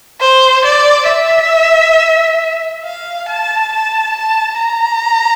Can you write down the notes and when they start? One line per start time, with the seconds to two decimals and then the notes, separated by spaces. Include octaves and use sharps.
0.21 C5
0.65 D5
1.09 E5
2.84 F5
3.28 A5
3.72 A5
4.16 A5
4.60 A#5